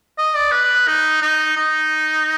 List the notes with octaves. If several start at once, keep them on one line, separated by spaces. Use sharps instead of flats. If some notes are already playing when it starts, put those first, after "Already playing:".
D#5
D5
B4
D#4
D#4
D#4